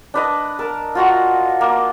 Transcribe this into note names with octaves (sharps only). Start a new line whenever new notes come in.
D4 B4 D#5
A#4 A5
F4 F#4 A#5
A#3